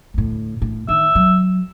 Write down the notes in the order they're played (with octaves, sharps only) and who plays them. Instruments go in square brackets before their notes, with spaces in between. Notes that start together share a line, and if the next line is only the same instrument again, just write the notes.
[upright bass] D2 A2
A2
[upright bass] D#3 [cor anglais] E5
[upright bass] F#3